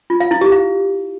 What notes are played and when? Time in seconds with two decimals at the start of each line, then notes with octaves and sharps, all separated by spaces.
0.10 F4
0.20 F5
0.31 E4
0.41 G4
0.52 F5